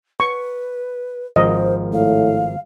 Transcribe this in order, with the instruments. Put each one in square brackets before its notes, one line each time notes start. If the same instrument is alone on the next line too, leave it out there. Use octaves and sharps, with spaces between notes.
[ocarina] B4 [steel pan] C#6
[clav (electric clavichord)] G#1 F3 A#4 [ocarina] C5 [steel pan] D#5
[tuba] A2 [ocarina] F5